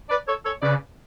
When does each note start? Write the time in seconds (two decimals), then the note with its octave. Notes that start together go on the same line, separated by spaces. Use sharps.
0.09 B4 D5
0.27 A4 C#5
0.45 A4 C#5
0.62 C#3 B4 D5